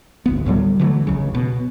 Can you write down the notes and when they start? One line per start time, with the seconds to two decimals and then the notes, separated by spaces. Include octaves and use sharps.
0.26 G#1 D2 B3
0.46 D2 A2 F#3 G3
0.79 D3 E3 F#3 A3
1.07 F1 C#2 C#3
1.35 B2